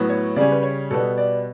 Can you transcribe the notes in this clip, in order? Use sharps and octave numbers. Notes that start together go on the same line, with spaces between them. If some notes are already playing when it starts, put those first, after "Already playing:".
Already playing: A2 F#3 B3
C#5
C#3 G3 C#4 D5
B4
C#5
B2 G3 B3 A4
D5